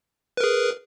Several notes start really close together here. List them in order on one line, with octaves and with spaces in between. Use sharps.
B4 A#4 G#4